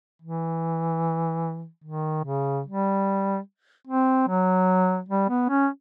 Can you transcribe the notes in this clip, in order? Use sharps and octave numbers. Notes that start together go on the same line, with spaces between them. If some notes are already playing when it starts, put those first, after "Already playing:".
E3
D#3
C#3
G3
C4
F#3
G3
B3
C#4